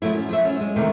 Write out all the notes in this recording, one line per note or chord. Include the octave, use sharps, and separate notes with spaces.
F3 F#3 A3 E4
C#4
F3 F#3 E5
C#4
G#3
C3 D#3 E3 A3